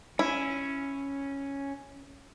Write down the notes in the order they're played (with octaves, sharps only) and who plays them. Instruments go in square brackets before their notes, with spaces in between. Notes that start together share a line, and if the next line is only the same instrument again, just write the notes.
[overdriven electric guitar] C#4 [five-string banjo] E4